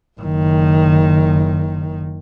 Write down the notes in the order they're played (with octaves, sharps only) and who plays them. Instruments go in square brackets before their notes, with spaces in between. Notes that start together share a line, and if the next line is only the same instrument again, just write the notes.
[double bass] F#1 D#3